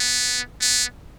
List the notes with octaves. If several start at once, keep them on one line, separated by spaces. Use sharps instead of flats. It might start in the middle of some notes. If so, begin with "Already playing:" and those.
Already playing: B3
B3